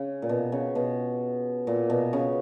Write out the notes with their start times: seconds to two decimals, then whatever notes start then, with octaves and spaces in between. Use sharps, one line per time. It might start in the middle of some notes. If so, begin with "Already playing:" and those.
Already playing: C#3
0.22 A#2
0.29 B2
0.52 C#3
0.75 B2
1.67 A#2
1.90 B2
2.13 C#3